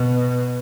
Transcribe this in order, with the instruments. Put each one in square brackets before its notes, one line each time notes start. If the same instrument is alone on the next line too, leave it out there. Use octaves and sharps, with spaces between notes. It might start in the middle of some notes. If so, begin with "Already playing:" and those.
Already playing: [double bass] B2